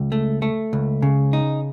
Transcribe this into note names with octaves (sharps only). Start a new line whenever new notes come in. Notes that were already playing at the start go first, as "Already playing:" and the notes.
Already playing: C#2
A3
A3
C#2
C#3
D#4